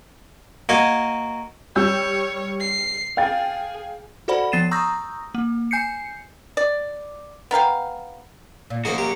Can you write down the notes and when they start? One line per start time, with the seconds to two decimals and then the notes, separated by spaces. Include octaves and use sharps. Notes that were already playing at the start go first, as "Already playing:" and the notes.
0.69 A#3 F#4 D#5 F5 G#5
1.76 G3 C#5 E6 G6
2.60 C7
3.17 G#4 F5 G5 A6
4.28 F#4 A4 C5 D5 F#5 B5
4.52 F3 B3 A6 C7 D#7 E7
4.71 A#5 C#6 D#6 E6 G6 A#6
5.35 A#3
5.71 G#5 G6 C7 C#7
6.57 D5
7.51 B3 A#4 F5 G5
8.70 A#2
8.85 F#2 A#3 D#4 F#4 G#4 C5
8.98 G4